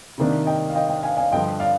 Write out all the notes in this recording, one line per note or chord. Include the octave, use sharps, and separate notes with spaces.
C3 D#3 A#3 D4
D#5 G5
F5
D#5 G5
D#5 G5
F5 G#5
F5 G#5
G2 D3 F3 D#5 G5
D5 F5